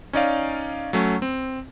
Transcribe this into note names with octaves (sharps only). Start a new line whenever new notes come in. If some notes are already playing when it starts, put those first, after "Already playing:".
C#4 D#4 D5 F5
F#3 A3 C#4
C4